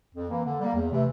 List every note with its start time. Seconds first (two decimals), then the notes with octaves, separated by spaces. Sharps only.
0.15 F2
0.30 E3 A#3
0.45 D3
0.60 G3 A#3
0.75 E2
0.90 C3 E3 A3